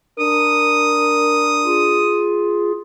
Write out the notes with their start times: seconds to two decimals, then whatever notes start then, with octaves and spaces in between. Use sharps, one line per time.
0.19 D4 A#4 D#6
1.65 F4 G#4